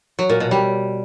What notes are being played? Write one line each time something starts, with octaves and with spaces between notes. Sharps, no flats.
F#3
A#2
B2
G3